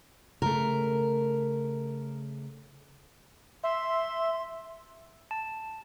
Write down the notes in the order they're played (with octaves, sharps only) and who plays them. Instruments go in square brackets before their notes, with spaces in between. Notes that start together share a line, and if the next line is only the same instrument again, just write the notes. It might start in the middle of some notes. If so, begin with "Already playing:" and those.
[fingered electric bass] C#3 A3 [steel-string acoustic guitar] A#4
[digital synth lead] E5 [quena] C6
[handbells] A5